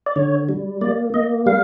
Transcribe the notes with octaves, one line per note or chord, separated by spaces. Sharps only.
D5
D3 C#5
G3
A#3 D5
A#3 D#5
G3 F5